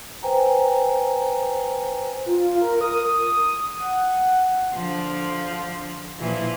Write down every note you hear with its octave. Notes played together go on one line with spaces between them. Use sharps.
B4 C5 G5 G#5 A#5
F4
A#4
D#6
F#5
D3 F3
A#2 E3 F3